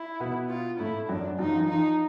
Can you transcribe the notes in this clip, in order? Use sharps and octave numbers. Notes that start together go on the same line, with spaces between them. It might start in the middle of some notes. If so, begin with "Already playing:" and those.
Already playing: E4
B2 B3
F4
A2 A3 E4
F#2 F#3 D4
F#2 F#3 D#4
F3
E3
F3 D#4